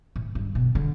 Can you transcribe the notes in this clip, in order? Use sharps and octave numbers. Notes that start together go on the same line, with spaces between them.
A2
G2
B2
D3